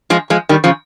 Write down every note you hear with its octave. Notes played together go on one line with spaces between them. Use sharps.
F3 G#3
F3 G#3
D#3 G3
C#3 F3